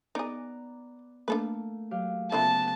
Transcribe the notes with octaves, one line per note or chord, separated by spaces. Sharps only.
B3 D#4 G#4 D5 A#5
A3 A#3 D4 A4 B4
F#3 G4 F5
D2 C#3 A3 B3 E4 F4 A5